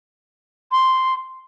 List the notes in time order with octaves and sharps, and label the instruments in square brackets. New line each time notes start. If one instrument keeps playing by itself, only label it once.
[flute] C6